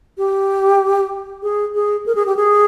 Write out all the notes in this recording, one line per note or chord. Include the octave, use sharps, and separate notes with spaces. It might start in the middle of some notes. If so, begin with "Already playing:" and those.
G4
G#4
G#4
A#4
G#4
G4
G#4